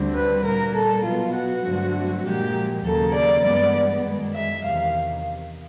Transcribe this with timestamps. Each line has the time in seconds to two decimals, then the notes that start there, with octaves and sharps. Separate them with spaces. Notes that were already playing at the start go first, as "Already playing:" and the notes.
Already playing: D2 D3 G3 C4
0.15 B4
0.44 A#2 G3 A#3 A#4
0.75 A4
1.04 B2 F#3 B3 F4
1.35 F#4
1.64 G2 D3 F#3 A3 C4
2.24 A#2 F3 G#3 G4
2.84 D#2 C#3 F#3 A#3 A4
3.14 D5
3.44 G2 E3 G#3 B3 D5
4.05 F#2 D#3 G#3
4.34 E5
4.64 E2 C3 D#3 F5